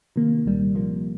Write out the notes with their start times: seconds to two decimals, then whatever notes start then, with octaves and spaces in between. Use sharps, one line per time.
0.16 C3 D#3 A#3
0.45 C2 A#2 G3
0.75 C3 F3 A#3